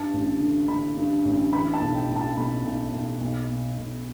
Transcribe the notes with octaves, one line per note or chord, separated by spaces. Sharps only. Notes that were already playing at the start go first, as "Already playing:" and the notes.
Already playing: G2 A5
A1
D3
D3 B5
G2
A1
E3 B5
A5
B1
G5
A2
A5
B1 B5
B1
B1
B1
B2
B1